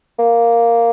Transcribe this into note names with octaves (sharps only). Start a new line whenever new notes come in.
A#3